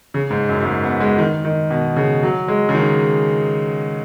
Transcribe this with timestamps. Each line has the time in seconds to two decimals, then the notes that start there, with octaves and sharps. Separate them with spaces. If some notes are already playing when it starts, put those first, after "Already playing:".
0.14 C#3
0.31 G#2
0.49 F#2
0.60 F#2
0.66 G#2
0.83 B3
1.00 G#3
1.18 D#3
1.45 D#3
1.70 B2
1.96 C#3
2.23 F#3
2.48 G#3
2.69 C#3
2.75 D#3